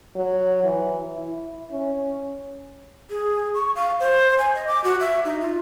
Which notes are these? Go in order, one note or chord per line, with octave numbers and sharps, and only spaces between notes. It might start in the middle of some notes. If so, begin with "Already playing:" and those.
F#3
E3
E4
C#4
G#4
C#6
F5
C5
G#5
D#5
D6
F#4
E5
D#4
F4